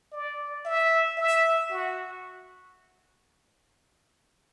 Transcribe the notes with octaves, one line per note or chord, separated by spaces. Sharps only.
D5
E5
E5
F#4